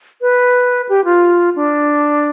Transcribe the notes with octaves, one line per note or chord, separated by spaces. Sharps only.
B4
G4
F4
D4